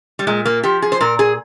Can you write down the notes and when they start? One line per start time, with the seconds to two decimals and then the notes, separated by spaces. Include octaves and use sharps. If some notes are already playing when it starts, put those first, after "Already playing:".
0.19 G3
0.27 A#2 G#3
0.45 A#3
0.63 F3 G4
0.82 G#4
0.92 C5
1.01 A#2 A#4
1.19 G#4